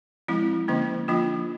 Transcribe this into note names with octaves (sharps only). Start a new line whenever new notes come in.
F3 G#3 C4 E4
D3 F3 A#3 C#4
F3 A#3 D4 F4